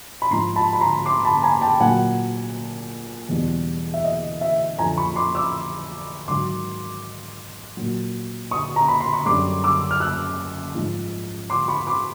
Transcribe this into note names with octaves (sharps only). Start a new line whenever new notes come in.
B5
G#2 F3 A#5 C6
A5 B5
B5
A#5 C6
C6 D6
A5 B5
G#5 A#5
G5 A5
A#2 F#3 F#5 G#5
E2 B2 G3
E5
D#5
E5
F2 D3 F3 G#5 A#5
B5 C#6
C6 D6
D6 E6
G#2 D#3 F#3 C6 D6
A#2 F#3
C#6 D#6
A#5
B5
C6
C#6
F#2 D3 G3 C6 D6
D6 E6
F6
E6 F#6
G#2 F3
C6 D6
B5 C#6
C6 D6